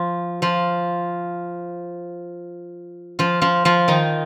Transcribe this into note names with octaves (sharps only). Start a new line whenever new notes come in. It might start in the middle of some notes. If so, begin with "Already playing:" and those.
Already playing: F3 F4
F3 F4
F3 F4
F3 F4
F3 F4
D#3 D#4